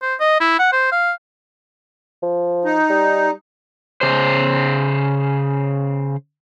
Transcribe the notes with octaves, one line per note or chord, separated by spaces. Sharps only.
C5
D#5
E4
F#5
C5
F5
F3
D#4
G3
C#3 C5